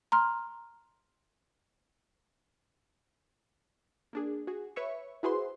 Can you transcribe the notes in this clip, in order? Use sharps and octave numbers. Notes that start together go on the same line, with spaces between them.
A#5 C6 F6
A#3 D4 G#4
F#4 G#4
B4 C#5 E5 C#6
E4 F#4 G#4 B4 C5 C6